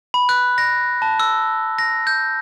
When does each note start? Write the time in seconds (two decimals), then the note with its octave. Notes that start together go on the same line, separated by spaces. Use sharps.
0.14 B5
0.29 F#6
0.58 A#6
1.02 A5
1.20 E6
1.79 A#6
2.07 G6